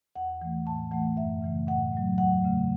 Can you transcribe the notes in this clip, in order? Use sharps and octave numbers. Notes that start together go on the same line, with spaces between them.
E2 F#5
E3 A3
A2 A5
E3 A3 F#5
F#2 E5
C#3 E3 A3
A2 F#5
F#3 A3
E2 F#5
C#3 A3